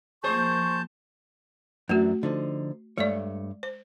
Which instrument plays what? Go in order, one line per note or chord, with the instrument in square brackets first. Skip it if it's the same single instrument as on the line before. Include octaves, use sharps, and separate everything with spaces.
[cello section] F3 A#3 [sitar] G#4 C5 [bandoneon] A5 G6 [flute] C#6
[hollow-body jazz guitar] F#2 E3 D4 [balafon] A3 F#4
[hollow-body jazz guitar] D3 F3 D#4
[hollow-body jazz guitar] G2 A3 C#5 [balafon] G#3 D5
[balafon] C5